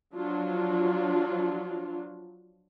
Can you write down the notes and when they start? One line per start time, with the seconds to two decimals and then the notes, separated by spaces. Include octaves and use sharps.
0.14 F3 F#3 D4 F4